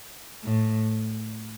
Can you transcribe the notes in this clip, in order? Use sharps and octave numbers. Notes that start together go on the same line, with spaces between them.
A2